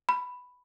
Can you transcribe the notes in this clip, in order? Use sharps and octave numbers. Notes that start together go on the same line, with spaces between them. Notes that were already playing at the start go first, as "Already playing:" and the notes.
B5